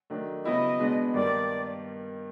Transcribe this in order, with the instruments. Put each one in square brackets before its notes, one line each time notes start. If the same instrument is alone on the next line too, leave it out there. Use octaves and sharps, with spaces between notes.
[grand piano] D#3 F#3 A3 D4
[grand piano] C#3 F#3 B3 E4 G4 [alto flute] D#5
[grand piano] B2 G#3 B3 D4
[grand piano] G2 D#3 G3 A#3 [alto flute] D5